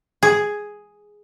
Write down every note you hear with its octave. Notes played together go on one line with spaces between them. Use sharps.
G#4